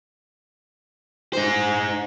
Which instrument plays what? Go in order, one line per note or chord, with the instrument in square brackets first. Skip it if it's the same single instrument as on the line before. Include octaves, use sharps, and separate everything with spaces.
[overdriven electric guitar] D#4 C5